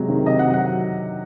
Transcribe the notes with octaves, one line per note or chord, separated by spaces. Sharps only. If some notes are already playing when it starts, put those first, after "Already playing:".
Already playing: C3 F#3 G#3
D#3
C3 D#5
F#5
F#3
F#5